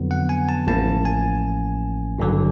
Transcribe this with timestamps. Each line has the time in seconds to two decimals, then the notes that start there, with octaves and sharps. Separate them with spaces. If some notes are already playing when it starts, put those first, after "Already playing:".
Already playing: F2 D3 F#3 B3
0.11 F#5
0.29 G#5
0.49 A5
0.67 A1 A2 F3 A#3 C#4 A5
1.05 G#5
2.18 G#1 G2 D3 F#3